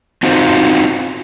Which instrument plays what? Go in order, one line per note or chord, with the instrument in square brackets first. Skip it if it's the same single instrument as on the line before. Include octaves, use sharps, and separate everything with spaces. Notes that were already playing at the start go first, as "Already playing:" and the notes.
[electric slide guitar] C4 D#4 F4 F#4 C5